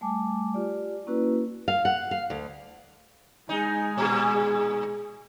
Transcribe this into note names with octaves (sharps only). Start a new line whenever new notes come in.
G3 A3 G#5 A5 D6
F4 G4 D5
A#3 C#4 E4 F#4 B4
F5
F#5
F5
D2
G#3 D#4 G#5
A#2 G#4